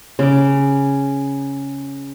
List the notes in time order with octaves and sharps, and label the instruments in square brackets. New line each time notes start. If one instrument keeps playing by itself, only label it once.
[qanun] C#3 D6